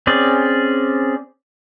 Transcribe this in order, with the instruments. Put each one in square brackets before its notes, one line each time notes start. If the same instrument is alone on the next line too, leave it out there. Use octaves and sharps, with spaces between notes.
[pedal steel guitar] C4 C#4 G#4 D5